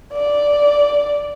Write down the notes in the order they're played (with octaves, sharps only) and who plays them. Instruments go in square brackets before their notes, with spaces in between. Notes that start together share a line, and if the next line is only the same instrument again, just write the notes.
[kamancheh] D5